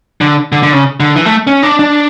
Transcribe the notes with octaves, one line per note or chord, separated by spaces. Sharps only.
D3
D3
D3
C#3
D3
E3
A3
C#4
D4
D4